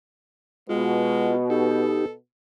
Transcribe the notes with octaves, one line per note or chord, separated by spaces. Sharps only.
B2 G#3 F4
D#4 G4 A4